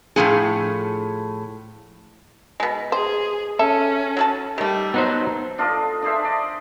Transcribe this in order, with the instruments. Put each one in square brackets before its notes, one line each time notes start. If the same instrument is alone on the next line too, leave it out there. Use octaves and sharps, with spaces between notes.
[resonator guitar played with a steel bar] A2 F3 B3 G#4
[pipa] B2 G#3
[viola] G#4 [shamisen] C5
[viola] C#4 [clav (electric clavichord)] A4 [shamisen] E5
[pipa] F#3 F#4 A5
[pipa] D#3 A3 [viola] G3
[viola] F#3 [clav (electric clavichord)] B3 D#4 C5
[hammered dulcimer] D4 F4 A4 D#5
D4 G#4 C5 E5
D5 D#5